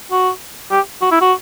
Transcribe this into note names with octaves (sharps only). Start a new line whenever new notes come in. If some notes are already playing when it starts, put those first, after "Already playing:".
F#4
G4
F#4
E4
F#4